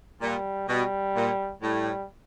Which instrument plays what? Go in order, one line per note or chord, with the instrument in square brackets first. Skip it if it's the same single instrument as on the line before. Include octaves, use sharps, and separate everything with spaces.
[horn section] A#2 [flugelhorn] G3
[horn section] B2 [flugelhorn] G3
[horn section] A#2
[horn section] A2 [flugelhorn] G3